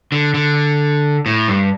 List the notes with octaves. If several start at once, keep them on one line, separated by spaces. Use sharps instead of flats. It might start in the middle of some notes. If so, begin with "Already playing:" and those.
D3
D3
A2
G2